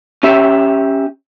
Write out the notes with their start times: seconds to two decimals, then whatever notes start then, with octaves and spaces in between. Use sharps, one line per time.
0.23 C#4 G4 E5